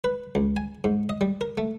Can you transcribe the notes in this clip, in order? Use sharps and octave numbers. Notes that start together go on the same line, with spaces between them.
B4
C#2
G#5
G#2
D#5
G3
A#4
A3